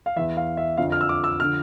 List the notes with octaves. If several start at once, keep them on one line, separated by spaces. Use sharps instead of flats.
F5
E2 E3 E5
F5
E5
F2 D3 F3 F5
F6
E6
D6
E6
D3 F3 F6